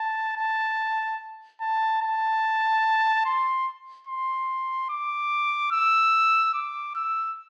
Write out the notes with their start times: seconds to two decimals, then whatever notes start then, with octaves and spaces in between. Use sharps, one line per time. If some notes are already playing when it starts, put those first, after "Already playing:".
Already playing: A5
0.37 A5
1.61 A5
2.02 A5
3.25 C6
4.07 C6
4.90 D6
5.72 E6
6.54 D6
6.95 E6